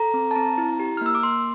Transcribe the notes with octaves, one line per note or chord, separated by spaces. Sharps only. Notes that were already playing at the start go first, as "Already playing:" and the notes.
Already playing: A4 A#5
C4
A5
C4 A#5
E4
G4
F6
A#3 E6
D6
A#3 C6